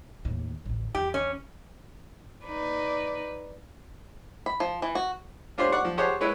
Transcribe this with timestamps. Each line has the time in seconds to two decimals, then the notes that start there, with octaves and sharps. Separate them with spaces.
0.25 D#2 A2
0.66 A1 D2
0.95 E2 G4
1.14 C#4
2.45 D#4 B4 D5
4.46 B5
4.60 F3
4.82 E3
4.95 F#4
5.58 C#4 D4 F4 G4 C5
5.72 D5 F#5 C#6 D6
5.85 F3
5.98 G4 G#4 C5 C#5 F#5 A5
6.21 G#3 E4 B4 C#5